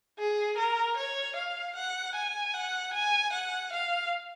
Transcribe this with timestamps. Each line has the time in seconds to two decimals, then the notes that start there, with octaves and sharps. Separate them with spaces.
0.19 G#4
0.58 A#4
0.97 C#5
1.36 F5
1.76 F#5
2.15 G#5
2.54 F#5
2.94 G#5
3.33 F#5
3.73 F5